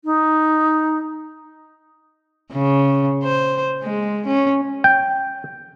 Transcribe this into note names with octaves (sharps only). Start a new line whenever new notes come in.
D#4
C#3
C5
G#3
C#4
G5